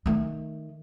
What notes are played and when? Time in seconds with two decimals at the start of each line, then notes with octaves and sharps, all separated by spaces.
0.06 D#3 A3